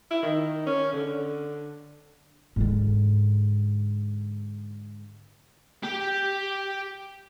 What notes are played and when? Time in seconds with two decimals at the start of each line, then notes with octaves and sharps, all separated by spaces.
0.11 E4
0.22 D#3
0.67 C#4
0.93 D3
2.56 G#2 D3
5.83 G4 G5